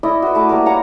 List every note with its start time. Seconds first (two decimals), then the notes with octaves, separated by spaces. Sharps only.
0.03 E4 D5 D#5
0.22 F#4 B4
0.35 A3 B4 D6
0.49 G3 A#3 A#4
0.66 C#5 F5 F#5 A#5